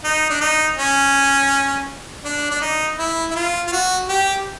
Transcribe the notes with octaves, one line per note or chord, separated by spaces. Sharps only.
D#4
D4
D#4
C#4
D4
D4
D#4
E4
E4
F4
F4
F#4
G4